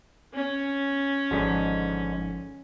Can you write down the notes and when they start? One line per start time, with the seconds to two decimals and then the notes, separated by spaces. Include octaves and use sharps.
0.33 C#4
1.31 G#1 G#2 D3 F3 D#4 B6